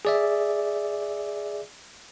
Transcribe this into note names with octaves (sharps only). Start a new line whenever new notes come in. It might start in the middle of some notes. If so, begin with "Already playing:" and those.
G#4 D5 E5